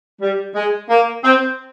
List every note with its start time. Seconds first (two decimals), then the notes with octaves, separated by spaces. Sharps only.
0.22 G3
0.55 G#3
0.90 A#3
1.24 C4